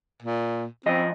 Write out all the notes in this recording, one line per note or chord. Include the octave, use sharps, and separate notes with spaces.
A#2
F#2 F3 C4 D#5